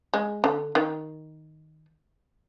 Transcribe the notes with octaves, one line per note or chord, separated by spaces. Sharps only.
G#3
D3
D#3